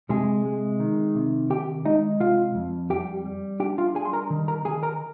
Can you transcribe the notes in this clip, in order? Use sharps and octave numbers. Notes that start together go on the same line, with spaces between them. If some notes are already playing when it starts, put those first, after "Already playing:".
C3 G#3 G#4
G#3
D#3
C3
D#3 G4 G5
G#3 D#4 D#5
C3 F4 F5
F2
G3 G4 G5
G3
D4 G4 G5
F4 F5
G3 G#4 G#5
C6
A#4 A#5
D#3
A#4 A#5
D#3 G#4 G#5
A#4 A#5